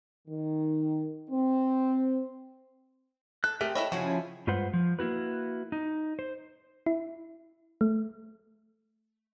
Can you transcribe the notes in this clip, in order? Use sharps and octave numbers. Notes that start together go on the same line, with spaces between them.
D#3
C4
A4 F#6
A3 C4 G4 G#4 A#4
E4 A4 C#5 D#5 B5
C#3 F3 C#4 E4 F#4 G#4
G2 G#3 F4 B4 C5 F#5
F3
A#3 E4 F#4 B4
D#4
C5
E4
A3